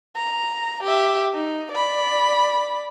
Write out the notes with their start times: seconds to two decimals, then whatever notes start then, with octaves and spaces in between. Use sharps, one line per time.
0.16 A#5
0.83 G4 E5
1.34 D#4
1.72 D5 B5